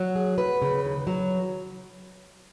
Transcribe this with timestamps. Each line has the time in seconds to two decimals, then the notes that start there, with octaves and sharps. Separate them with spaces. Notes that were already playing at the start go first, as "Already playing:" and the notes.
Already playing: F#3
0.16 G#4
0.38 B4
0.62 C#3
0.84 D#2
1.07 F#3